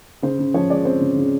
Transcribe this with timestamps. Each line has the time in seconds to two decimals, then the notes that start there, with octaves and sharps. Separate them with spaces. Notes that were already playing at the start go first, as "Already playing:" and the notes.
0.23 C#3 C5
0.39 C#3
0.54 F3 C#5
0.70 G#3 D5
0.85 C4 C5
1.01 C#3
1.16 C#3